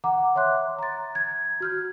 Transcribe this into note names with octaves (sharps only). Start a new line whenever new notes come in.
F#5 A#5 D6
C#5 E5 C6 F#6
A#5 A6
G#6
F#4 F6 G6